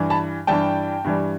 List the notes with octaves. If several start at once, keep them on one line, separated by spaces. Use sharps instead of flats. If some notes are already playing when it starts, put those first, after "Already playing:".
Already playing: G2 E3 G3
A5 B5
G2 E3 G3 G5 A5
G2 E3 G3